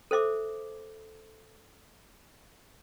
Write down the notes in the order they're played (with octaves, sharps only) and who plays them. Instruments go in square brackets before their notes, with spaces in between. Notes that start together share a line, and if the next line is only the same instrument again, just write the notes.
[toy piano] A4 C5 E5 D6